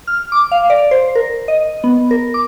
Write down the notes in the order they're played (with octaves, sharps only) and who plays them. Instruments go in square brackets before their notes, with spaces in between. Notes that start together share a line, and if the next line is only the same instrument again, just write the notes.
[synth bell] F6
D6
F5
D5
C5
A#4
D#5
B3
A#4
D6